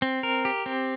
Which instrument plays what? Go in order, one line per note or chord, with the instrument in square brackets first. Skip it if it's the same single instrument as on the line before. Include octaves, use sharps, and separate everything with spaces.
[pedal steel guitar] C4
A#4
G4
C4